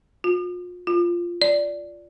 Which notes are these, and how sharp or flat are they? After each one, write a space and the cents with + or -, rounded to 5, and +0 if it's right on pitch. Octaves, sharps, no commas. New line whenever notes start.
F4 +35
F4 -5
D5 -10